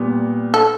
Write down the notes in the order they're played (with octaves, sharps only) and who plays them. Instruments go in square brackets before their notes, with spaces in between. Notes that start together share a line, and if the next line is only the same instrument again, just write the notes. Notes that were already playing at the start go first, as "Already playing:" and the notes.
Already playing: [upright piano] A#2 G3 B3
[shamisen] A4